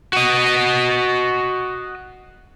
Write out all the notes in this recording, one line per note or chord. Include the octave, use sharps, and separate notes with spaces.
F#4 D#5